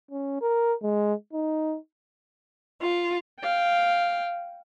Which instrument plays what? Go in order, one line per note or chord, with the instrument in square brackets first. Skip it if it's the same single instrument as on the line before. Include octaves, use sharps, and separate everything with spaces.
[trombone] C#4
A#4
G#3
D#4
[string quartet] F4
[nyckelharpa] F5 G5